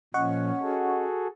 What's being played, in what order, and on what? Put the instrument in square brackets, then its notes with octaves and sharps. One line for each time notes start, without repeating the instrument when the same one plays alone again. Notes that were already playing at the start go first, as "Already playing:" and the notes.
[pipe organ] A#2 F3 [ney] C#4 [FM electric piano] D#5 F#5 C#6
[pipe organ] F#4 G#4 A4